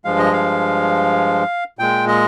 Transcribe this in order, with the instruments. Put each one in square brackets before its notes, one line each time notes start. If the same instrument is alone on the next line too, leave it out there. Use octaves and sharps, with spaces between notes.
[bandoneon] G2 F3 G#3 F5
D#5
F5
A#2 G#3 G5
D#5